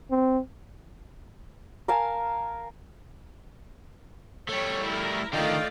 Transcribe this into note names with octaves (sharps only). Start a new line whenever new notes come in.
C4
A#4 F5 G#5 A5
G3 A3 C#5
E4 A#4
D3 D#3 A3 F4 D5 D#5 F5 G5